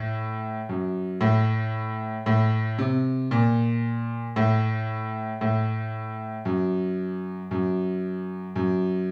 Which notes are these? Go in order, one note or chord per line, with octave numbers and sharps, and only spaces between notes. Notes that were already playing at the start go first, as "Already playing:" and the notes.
Already playing: A2
F#2
A2
A2
C3
A#2
A2
A2
F#2
F#2
F#2